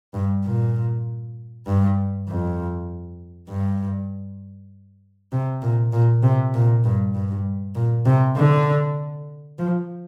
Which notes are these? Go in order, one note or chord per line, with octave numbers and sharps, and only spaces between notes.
G2
A#2
G2
F2
G2
C3
A#2
A#2
C3
A#2
G2
G2
A#2
C3
D3
F3